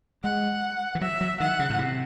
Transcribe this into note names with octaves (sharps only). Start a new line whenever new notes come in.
G#3 F#5
E3
F#3 E5
F#3
D#3 F#5
C#3
A2
C3